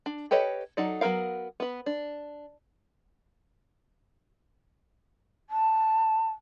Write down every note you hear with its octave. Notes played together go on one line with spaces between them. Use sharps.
D4
G4 A4 B4 C#5 D#5
F#3 D#4 A4 D5
F#3 B3 A4 A#4 F5
B3 B4
D4
A5